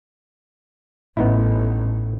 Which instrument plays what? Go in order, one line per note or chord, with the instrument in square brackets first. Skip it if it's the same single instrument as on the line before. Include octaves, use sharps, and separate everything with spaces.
[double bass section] A1 [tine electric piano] A2 [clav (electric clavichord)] B3 D#4 E4